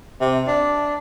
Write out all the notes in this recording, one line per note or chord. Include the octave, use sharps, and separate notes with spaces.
C3
D4